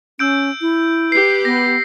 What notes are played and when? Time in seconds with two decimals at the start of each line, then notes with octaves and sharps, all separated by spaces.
0.19 C#4 E6 G6 D7
0.61 E4
1.12 G4 B4 C7
1.45 B3 A#6